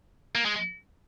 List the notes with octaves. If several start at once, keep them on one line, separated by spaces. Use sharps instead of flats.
A#3
G#3